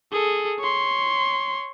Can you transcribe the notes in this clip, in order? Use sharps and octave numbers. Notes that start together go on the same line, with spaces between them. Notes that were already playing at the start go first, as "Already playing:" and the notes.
G#4 A4
C#5 C6